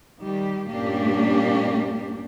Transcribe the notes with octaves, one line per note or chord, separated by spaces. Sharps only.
D#3 G3 G4
G2 A#2 A#3 C#4 D4 G4